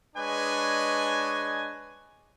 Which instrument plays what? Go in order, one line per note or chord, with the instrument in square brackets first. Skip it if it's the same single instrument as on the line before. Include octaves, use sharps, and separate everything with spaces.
[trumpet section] G#3 D4 B4 C#5 D#5 G#5